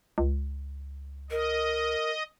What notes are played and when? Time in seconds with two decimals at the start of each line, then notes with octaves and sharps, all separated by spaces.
0.18 C#2
1.31 A#4 D#5